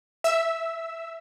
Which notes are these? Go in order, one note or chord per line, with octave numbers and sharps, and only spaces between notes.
E5 E6